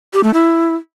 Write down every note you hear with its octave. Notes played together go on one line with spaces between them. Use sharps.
G4
A3
E4